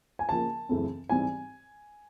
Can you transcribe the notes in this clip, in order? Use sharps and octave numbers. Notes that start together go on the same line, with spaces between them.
G#5
C#3 F3 A#3 A5
F#2 C#3 E3 A3 C4
G#2 E3 G3 C4 G#5